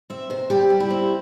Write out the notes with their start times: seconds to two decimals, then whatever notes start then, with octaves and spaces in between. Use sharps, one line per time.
0.10 C4 E5
0.30 C3 C5
0.50 G3 G4
0.70 G3
0.80 E4
0.90 C4